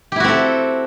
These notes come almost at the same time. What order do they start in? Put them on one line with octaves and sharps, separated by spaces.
G4 E4 F#4 C4 A4